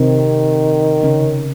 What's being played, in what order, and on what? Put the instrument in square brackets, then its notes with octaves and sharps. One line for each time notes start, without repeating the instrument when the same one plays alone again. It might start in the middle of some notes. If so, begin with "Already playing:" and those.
Already playing: [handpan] C3 C4 [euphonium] D#3
[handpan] C#3 C#4